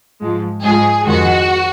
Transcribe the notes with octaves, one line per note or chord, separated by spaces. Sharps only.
G#2 F3 G#3
G#2 F3 G#3 G#4
F2 D#3 G#3 F#4